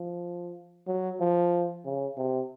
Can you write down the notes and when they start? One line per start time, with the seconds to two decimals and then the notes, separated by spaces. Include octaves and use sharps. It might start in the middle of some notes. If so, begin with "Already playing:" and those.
Already playing: F3
0.87 F#3
1.20 F3
1.85 C#3
2.17 C3